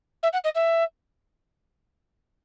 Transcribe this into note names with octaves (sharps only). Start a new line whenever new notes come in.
E5
F#5
D#5
E5